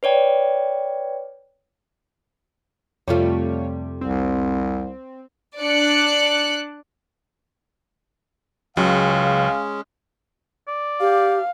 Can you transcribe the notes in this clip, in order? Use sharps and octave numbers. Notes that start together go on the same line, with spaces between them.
B4 C#5 D5 G5
F2 C3 G3 A3 F4 C#5
C2 C4
D4 D5 F#6 C#7
C#2 C#3 F#3 G#3 C#4 F5
D5
G4 F5